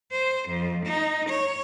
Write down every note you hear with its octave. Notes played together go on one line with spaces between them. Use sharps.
C5
F2
D#4
C#5